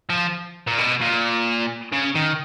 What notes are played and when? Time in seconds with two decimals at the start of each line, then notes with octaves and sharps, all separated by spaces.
0.10 F3
0.67 A#2
0.78 B2
1.01 A#2
1.92 C#3
2.15 D#3